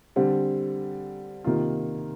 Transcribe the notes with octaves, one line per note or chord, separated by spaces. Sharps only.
D3 G3 C4
C3 D#3 A#3 F4